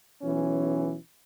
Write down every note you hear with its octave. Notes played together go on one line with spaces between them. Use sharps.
B1 E3 C#4